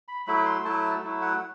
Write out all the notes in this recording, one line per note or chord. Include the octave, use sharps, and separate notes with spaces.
B5
F#3 A3 E4 B5
C6
F#3 A3 E4 A5
F#3 A3 E4
F#5